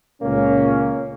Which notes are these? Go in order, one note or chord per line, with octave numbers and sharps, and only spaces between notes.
C#2 A#2 A#3 C#4